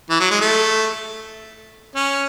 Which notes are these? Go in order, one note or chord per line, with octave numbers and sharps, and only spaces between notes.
E3
F#3
G#3
A3
C#4